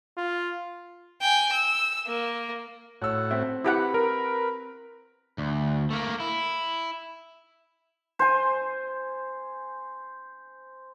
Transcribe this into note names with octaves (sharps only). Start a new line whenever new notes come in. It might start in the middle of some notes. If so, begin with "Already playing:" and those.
F4
G5 G#5
E6
A#3
A2 F#4 C#5 E6
C4 E5
E4 G4 B4 F#5
A#4
D2
A3 A#3
E4
C5 G#5